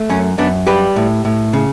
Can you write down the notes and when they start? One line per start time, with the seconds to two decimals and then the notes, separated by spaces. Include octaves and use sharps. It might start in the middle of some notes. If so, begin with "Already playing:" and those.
Already playing: A3
0.09 F#2 C#4
0.38 F#2 B3 D4
0.67 G3 G4 B4
0.96 A2
1.25 A2
1.53 C#3